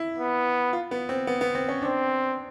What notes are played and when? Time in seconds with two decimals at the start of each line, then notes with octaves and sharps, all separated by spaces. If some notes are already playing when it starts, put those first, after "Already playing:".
Already playing: E4
0.19 B3
0.73 F4
0.91 B3
1.09 C4
1.27 B3
1.41 B3
1.55 C4
1.69 C#4
1.82 C4 D4